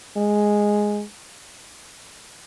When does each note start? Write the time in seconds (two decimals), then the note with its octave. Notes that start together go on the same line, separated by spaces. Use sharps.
0.17 G#3